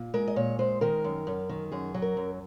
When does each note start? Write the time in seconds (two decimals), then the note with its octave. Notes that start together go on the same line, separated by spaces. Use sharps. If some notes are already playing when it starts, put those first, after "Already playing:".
Already playing: A#2
0.14 G#3 A#4
0.27 D#5
0.36 A#2 C#5
0.59 G#3 C5
0.81 D#3 A#4
1.04 F#2
1.27 F#2
1.49 D#3
1.72 F#2 G#4
1.94 F#3
2.02 A#4
2.17 F#2